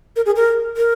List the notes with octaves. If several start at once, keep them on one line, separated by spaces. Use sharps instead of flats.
A#4
G#4
A#4
A#4